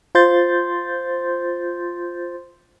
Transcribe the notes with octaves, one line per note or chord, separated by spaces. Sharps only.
F4 C5 C6 G6 A6